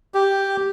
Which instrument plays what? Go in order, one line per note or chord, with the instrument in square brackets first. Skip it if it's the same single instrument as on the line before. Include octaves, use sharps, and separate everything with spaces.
[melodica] G4